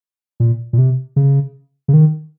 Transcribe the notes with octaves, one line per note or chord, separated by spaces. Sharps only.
A#2
A#2
C3
C#3
C#3
D#3